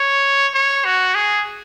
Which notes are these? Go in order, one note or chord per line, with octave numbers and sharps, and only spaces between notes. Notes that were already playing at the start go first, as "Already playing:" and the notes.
Already playing: C#5
C#5
F#4
G#4